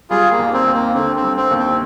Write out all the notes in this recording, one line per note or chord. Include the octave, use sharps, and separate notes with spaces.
G3 F4 G#4
A#3
D#2
C4
D#2
A#3
D3 C4
C4
G3
C4
D#2
C4